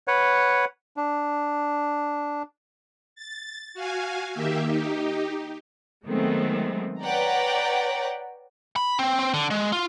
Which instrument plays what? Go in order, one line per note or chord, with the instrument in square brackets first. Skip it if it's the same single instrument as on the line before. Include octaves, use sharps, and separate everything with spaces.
[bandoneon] B4 C#5 F#5
D4
[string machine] A6
F#4 F5 G#5
D#3 A#3 G4 E5
D#4 G4
[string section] D#3 F#3 G#3 A3 B3 C4
B4 C#5 D5 F#5 G5 A#5
[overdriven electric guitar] B5
C4
C4
D3
G#3
F4